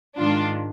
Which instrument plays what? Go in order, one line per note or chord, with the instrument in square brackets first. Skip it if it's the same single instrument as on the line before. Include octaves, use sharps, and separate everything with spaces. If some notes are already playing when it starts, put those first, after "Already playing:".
[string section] G#2 D#3 G#3 D4 F4